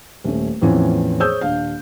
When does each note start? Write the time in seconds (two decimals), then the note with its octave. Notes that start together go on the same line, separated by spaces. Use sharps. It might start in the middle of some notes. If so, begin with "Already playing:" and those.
0.24 D#1 A3 C#4
0.62 E2 A2 E3 F3 C4 C#4
1.20 G#4 C5 C#5 D#6 E6 G6
1.41 D#1 D4 F5